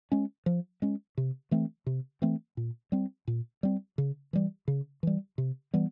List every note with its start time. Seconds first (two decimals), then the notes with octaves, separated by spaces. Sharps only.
0.12 G#3 C#4
0.46 F3
0.82 G#3 C#4
1.17 C3
1.51 E3 A3 C4
1.86 C3
2.22 E3 A3 C4
2.57 A#2
2.92 G3 C4
3.28 A#2
3.63 G3 C4
3.98 C#3
4.33 E3 G3
4.68 C#3
5.03 E3 G3
5.38 C3
5.74 E3 G3 B3